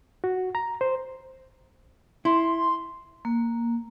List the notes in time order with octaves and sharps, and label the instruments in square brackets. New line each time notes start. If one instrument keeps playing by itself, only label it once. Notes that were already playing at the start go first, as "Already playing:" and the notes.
[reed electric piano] F#4
A#5
C5
[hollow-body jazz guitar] E4 [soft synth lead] C6
[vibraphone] A#3